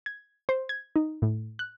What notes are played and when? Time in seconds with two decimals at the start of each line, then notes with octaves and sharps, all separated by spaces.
0.06 G#6
0.49 C5
0.69 G#6
0.96 D#4
1.22 A2
1.59 F#6